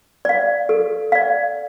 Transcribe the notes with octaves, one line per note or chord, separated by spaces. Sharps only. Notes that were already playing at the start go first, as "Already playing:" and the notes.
D5 F5
A4
D5 F5